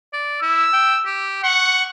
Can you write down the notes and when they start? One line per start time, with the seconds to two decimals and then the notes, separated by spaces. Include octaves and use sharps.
0.13 D5
0.42 E4 E6
0.73 G5
1.05 G4
1.43 F#5 C#6